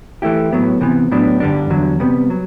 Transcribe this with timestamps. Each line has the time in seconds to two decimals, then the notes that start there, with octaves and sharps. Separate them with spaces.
0.22 E3 A3 E4 G4
0.52 A2 F#3 B3
0.81 C3 E3 B3
1.11 A2 F#3 B3 D4
1.40 G2 D3 G3 D4
1.70 E2 D3 F#3
2.00 C3 G3 B3
2.30 F#3